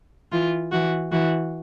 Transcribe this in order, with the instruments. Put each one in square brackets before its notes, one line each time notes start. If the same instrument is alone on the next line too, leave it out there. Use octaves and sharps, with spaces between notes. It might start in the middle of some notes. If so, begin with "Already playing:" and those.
[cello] E3 [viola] F4
[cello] E3 [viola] F#4
[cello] E3 [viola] F#4